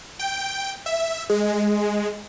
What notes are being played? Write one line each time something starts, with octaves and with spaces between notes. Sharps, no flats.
G5
E5
G#3